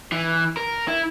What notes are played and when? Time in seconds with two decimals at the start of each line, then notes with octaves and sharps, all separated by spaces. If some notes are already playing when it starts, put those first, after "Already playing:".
0.12 E3
0.57 A#4
0.88 E4